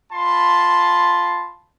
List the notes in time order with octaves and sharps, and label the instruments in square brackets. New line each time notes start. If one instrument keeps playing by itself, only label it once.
[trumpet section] F4 A5 B5 C6